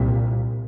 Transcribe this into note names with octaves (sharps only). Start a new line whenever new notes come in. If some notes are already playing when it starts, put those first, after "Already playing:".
Already playing: C2 A#2